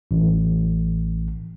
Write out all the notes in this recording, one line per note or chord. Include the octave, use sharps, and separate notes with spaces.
A1